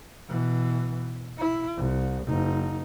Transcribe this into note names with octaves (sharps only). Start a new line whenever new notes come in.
B2 E3
E4
C2
F#1 D#4